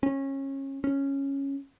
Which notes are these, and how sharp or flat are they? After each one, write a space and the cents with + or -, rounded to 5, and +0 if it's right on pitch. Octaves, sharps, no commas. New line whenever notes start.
C#4 -25
C#4 -5